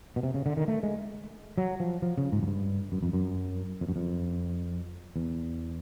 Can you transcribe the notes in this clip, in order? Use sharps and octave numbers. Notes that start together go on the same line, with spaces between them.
B2
C3
C#3
D3
D#3
A3
G#3
F#3
F3
F3
C#3
G#2
F#2
G2
F#2
F2
F#2
F2
F#2
F2
E2